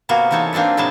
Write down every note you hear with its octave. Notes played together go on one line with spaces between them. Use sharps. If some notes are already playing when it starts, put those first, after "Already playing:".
C3 A#3 B3 F#4 G#4
E3 G#3 D#4 A4 C#5
A#3 C4 D4 A4 B4
A2 C3 F#3 B3 G#4 A5